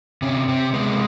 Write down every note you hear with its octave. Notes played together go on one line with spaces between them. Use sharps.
C3 C#4
C3 C4
G#3 B3
A#3